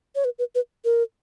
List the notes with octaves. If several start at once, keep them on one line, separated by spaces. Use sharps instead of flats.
C#5
B4
B4
B4
A#4